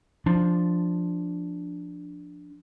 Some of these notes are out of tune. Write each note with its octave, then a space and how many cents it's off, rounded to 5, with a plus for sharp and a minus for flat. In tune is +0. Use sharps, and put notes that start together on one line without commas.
F3 +0 D4 +0